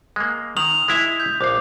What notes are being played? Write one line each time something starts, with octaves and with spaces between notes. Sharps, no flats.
G#3 A#3
D#3 D#6 F7 F#7
G#3 E4 E5
G6
A#1 F5 D6